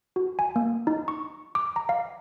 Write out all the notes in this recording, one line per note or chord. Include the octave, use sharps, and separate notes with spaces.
F#4
G#5
A#3
D#4
C#6
D6
A#5
F5